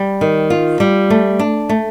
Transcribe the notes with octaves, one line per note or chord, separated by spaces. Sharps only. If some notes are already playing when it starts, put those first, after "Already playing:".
Already playing: G3
D#3
F4
G3
A3
D4
A3